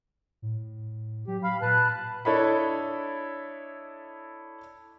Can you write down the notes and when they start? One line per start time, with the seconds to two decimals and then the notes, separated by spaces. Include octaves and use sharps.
0.42 A2
1.27 F#3 G4
1.43 F5 B5
1.62 A#2 B4 A5 F#6
2.25 D4 E4 A4 C#5 D#5 B5